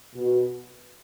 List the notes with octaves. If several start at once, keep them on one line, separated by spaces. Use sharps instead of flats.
B2